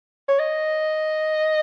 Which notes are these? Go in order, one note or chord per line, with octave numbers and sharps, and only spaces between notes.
C#5
D#5